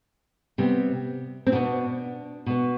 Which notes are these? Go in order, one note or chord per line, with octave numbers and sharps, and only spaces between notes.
C3 G3 B3
C4
B2 B3 D4
B2 B3